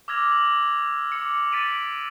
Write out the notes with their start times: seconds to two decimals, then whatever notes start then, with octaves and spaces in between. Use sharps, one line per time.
0.08 D6 E6 F6 G#6 A#6 F7
0.32 F#7
1.12 D6 C#7
1.52 A6 B6 D7 D#7 F#7